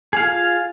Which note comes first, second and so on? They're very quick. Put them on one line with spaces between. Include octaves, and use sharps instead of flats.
G#4 F5 F4